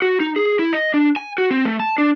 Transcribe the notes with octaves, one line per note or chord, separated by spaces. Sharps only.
F#4
D#4
G#4
E4
D#5
D4
G#5
F#4
C4
A3
A5
D4